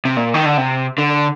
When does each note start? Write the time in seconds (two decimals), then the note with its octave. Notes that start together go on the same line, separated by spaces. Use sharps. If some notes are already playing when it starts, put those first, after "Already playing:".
0.05 C3
0.17 A#2
0.34 D#3
0.45 D3
0.57 C3
0.98 D3